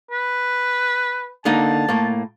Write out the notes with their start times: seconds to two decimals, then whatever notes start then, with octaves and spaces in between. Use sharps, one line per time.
0.11 B4
1.45 D3 A#3 D#4 A5
1.89 A2 A#3